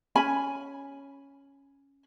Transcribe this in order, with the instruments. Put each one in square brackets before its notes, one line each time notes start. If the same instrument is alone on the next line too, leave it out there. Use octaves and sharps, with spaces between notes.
[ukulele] C#4 G#5 B5